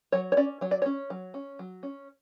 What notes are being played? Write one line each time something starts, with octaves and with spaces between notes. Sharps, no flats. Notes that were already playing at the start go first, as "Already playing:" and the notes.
F#3 C#5
C#5
C#4 D5
F#3 C#5
D5
C#4 C#5
F#3
C#4
F#3
C#4